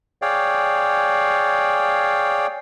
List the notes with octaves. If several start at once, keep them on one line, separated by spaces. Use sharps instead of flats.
G#4 C#5 D5 F5 G5